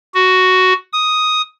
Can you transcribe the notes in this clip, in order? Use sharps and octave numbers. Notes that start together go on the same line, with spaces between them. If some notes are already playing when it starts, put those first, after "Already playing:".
F#4
D#6